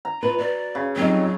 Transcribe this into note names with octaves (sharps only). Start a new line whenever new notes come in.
A#5
F4 B4
F#4 D5
C#3
F2 F#3 G3 D#4